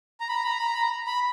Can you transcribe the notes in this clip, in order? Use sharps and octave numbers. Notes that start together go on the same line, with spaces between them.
A#5
B5
A#5
B5
A#5
B5
A#5
B5
A#5
B5